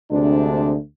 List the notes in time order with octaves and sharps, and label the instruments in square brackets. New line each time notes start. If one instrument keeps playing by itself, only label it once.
[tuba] D2 [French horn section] C3 G#3 D4